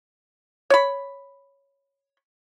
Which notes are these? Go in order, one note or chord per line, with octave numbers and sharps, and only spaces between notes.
C#5 B5